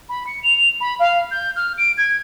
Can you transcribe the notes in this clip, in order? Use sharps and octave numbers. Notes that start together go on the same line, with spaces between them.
B5
C#7
F7
B5
F5
G6
F6
D7
G#6